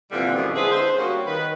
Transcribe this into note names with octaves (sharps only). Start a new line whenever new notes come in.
A#2 D3 E3 G3 C4 F4
F#2 B2 D#3 A3 B3 C4
D3 G#3 E4 G#4 B4 C5
C5
G3 A#3 B3 C#4 F#4
D#3 B4